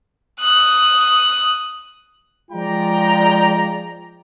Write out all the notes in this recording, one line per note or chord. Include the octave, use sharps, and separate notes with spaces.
D#6 F#6
F3 G#3 F4 D5 G5 A#5